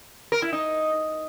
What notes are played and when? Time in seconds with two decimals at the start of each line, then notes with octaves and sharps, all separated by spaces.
0.32 A#4
0.42 E4
0.53 D#4